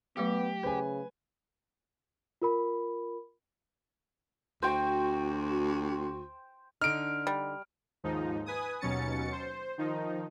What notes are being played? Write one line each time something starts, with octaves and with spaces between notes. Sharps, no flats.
F#3 A3 B3 G4 F5
C#3 B4 C5 G#5
F4 A#4 B5
D2 F#4 C5 G5
D3 D#4 F6 D7
G3
D#2 G#2 F3 D#4
B4 G#5 D#6
D#2 B2 F#3 C#4 A6 C#7
C5
D#3 F3 D#4